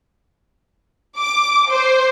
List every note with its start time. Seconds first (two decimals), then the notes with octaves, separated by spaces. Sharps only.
1.17 D6
1.68 C5